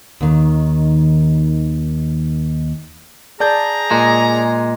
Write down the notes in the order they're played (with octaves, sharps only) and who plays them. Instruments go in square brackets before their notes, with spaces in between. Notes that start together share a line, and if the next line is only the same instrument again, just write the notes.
[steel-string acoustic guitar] D#2 D#3
[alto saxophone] G#4 [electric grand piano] D5 A5 G6 [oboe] A#5
[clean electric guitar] A#2 G#3